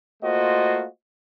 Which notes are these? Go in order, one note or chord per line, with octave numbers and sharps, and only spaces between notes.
A3 A#3 F4 F#4 C5 D#5